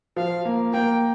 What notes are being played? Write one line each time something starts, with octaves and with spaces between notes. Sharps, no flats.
F3 F5
A#3
A#3 G5